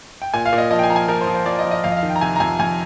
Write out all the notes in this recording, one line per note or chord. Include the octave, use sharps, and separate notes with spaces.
G5
A#2 G#5
F5
A#2
D#5
F3 D#5
G5
G#5
F3 A#5
G#5
F3 A#4
C5
F3
C5
F3 D5
D#5
F3
D#5
F2 F5
D#5
F5
D#3
G5
A#5
C3 G#5
A#5
F2 G#5
F2 G#5